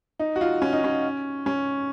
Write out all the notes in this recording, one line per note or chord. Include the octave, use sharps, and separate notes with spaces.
D#4
F#4
F4
C#4
D#4
C#4
C#4